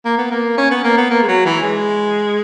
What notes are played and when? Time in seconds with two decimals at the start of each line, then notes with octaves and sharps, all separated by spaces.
0.05 A#3
0.18 B3
0.31 A#3
0.58 C#4
0.71 B3
0.84 A#3
0.97 B3
1.11 A#3
1.23 G#3
1.28 F#3
1.45 E3
1.63 G#3